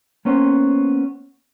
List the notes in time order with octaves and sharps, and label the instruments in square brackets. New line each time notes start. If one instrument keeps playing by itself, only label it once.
[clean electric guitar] A#3 B3 C#4 C5